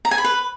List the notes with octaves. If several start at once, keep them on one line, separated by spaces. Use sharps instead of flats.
A#5
G#5
B5
B4